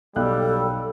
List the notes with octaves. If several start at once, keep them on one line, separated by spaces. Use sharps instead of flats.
B1 G3 A4 F5 F#6